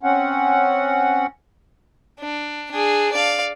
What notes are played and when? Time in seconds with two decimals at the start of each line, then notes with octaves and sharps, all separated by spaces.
0.03 C4 C#4 F#5
2.20 D4
2.72 D4 G#4
3.13 D5 F5